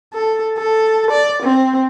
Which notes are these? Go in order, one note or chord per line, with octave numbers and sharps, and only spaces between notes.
A4
A4
D5
C4